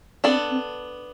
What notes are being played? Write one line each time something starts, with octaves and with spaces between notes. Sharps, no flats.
B3 C4 D4 A4
C4